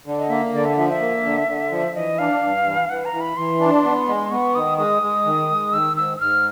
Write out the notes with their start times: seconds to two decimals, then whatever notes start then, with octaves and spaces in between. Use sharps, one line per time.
0.06 D3
0.18 D#5
0.30 A#3 E5
0.53 D3 D5
0.65 E5
0.77 F3 E5
0.90 E5
1.01 A#3
1.24 D3
1.48 D3
1.71 F3
1.95 E3 D#5
2.19 D4 F5
2.43 G2
2.66 E3
2.89 E3 F#5
3.05 A#5
3.13 E3
3.21 B5
3.37 E3 C6
3.60 D4
3.84 B3
4.08 G#3
4.31 B3 C#6
4.55 D#3 D#6
4.78 G#3 D#6
5.02 G#3
5.26 D#3
5.50 G#3
5.73 D#3 E6
5.97 G#2 E6
6.17 E6
6.20 G#2 F6